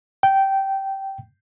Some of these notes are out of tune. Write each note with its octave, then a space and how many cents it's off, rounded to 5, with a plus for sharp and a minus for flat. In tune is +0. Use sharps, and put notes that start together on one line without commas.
G5 -15